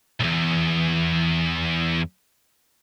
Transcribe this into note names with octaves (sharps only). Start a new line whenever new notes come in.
B1 E2